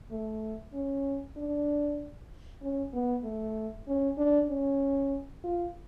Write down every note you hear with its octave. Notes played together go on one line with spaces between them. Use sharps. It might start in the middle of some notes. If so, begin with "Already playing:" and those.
A3
C#4
D4
C#4
B3
A3
C#4
D4
C#4
F4